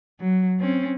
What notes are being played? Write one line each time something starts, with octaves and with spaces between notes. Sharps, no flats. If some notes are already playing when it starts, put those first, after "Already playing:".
F#3
C4 C#4